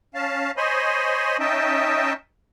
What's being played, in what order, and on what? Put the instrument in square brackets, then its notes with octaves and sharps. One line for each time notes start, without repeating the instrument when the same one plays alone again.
[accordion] C#4 F5 A5
C5 C#5 D#5 G#5 B5 C6
C#4 D#4 D#5 E5 G5 A5